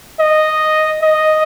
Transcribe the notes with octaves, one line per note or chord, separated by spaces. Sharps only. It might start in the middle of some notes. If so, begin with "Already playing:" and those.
D#5
D#5